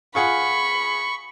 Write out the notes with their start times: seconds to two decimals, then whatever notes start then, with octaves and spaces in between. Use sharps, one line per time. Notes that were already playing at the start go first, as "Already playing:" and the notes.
0.15 F4 G#4 F#5 B5 C#6